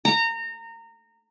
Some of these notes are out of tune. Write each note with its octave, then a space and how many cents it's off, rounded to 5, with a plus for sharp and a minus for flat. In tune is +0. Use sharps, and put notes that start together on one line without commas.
A#5 -25